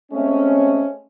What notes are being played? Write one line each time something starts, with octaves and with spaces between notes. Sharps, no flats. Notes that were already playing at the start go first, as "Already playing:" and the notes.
G#3 A3 C4 C#4